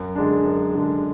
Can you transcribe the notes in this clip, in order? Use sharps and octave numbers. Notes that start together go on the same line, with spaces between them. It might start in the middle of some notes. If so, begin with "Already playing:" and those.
Already playing: F#2
D3 G#3 D4
F#2
D3 G#3 D4